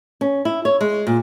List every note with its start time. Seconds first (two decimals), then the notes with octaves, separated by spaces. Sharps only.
0.21 C#4
0.45 E4
0.65 C#5
0.81 G#3
1.07 A#2